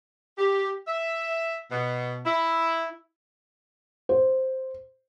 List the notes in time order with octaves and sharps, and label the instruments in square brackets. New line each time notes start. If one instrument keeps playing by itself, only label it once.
[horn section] G4
E5
B2
E4
[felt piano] C5